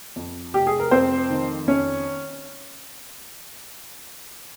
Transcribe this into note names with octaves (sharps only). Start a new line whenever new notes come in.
F2
F1 G4
G#4
A#4
F2 C4 C5
D#3
F2 C#4 C#5